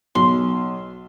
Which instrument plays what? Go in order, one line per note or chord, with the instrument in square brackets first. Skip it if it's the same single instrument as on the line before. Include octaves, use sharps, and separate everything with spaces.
[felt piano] B1 [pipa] C6